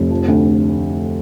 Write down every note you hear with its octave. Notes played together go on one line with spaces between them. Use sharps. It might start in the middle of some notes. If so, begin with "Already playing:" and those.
Already playing: F1
F3
D2